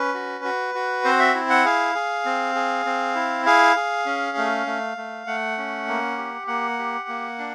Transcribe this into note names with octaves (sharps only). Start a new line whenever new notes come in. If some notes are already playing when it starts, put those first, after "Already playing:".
Already playing: C#4 B4
F#4
F#4
F#4
C4 C5
E5
E4
F#5
G#4 F5
G#4
C4
G#4
C4
E4
G#4 F5
G#4
C#4
A3
A3
A3
A3 F#5
C#4
A#3
G4
A#3 F#5
G4
A#3
D4